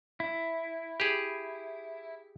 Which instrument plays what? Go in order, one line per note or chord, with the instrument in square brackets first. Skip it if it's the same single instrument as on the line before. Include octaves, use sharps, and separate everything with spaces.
[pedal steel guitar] E4
[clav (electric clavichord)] G4 G#4